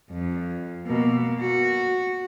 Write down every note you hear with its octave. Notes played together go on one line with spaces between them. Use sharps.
F2
B2 A#3
F#4